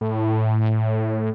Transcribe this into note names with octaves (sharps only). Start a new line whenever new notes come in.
A2